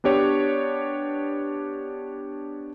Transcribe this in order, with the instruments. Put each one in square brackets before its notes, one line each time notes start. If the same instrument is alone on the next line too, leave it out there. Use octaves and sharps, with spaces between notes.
[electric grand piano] B3 D4 G4 C#5